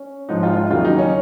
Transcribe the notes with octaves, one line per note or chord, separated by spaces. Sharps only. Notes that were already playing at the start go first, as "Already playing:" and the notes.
Already playing: C#4
G#2 F3 D#4
F4
F4
D#2 C#3 F#3 F4
D#4
C#4